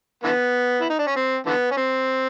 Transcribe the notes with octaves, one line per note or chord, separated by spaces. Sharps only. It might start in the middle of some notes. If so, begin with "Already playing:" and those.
D3 E3 B3
E4
D#4
D4
C#4
C4
D3 E3 B3
C#4
C4